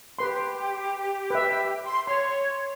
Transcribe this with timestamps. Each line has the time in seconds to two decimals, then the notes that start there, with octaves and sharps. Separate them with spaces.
0.19 G4 B4 C6
1.30 B4 E5
1.84 C6
2.07 C#5 C6